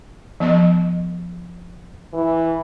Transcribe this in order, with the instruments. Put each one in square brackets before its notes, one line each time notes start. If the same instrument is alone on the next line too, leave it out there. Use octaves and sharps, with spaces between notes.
[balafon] F3 B3 D#5
[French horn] E3